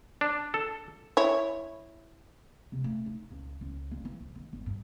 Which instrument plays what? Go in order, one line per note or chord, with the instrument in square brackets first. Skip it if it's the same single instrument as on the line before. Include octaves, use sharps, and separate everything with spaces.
[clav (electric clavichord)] D4
A4
[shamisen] E4 C#5
[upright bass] C3
A3
D#4
C#2
C#2
F#1
E3
C2
D#3
G1
G2